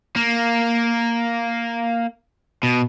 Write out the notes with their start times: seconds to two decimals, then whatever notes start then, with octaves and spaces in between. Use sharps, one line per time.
0.16 A#3
2.63 B2